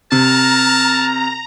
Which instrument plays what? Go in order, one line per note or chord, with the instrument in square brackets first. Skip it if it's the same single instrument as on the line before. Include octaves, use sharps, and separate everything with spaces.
[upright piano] C3 [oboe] A#4 [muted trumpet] A5 [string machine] A#5